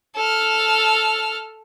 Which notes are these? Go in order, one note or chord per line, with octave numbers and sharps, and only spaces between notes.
A4 F6